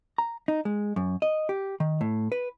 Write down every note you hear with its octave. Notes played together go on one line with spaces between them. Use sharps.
A#5
D#4
G#3
F#2
D#5
G4
D#3
A2
B4